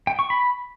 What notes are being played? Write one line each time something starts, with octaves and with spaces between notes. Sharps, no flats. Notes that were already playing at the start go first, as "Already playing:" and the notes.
G5
C#6
B5